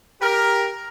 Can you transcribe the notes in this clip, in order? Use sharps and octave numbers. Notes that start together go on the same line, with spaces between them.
G4 A#4